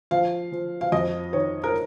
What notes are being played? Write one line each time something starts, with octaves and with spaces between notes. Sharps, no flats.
F3 F5
F3
F5
F2 D#5
D#3 C#5
A#4